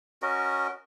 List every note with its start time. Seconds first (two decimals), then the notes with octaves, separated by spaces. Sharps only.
0.22 C#4 F#4 A#4 D#5